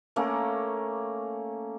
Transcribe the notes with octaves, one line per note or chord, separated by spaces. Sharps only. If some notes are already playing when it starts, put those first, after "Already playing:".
A3 A#3 C#4